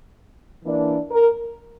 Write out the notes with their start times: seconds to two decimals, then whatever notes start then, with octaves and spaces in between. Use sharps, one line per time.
0.63 E3 A#3 D4
1.11 A#4